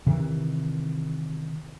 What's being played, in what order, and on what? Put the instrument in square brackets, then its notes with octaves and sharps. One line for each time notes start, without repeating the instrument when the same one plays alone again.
[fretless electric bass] C3 D#3 E3